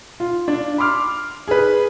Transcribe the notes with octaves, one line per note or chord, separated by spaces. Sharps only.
F4
D4
B5 C6 D6 F6
G#4 B4